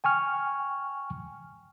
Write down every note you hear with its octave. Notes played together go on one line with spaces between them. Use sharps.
G5 G#5 C#6 F6